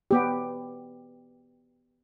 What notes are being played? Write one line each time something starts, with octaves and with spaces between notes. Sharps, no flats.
B3 G4